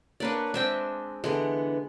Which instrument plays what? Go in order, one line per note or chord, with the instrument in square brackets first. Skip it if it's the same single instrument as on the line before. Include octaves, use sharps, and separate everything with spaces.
[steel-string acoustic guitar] A#3 C#5 [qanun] D4 B4 D5
[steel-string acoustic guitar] G#3 C4 [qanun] D4 E5 G5
[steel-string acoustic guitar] D3 E3 B3 [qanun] G#3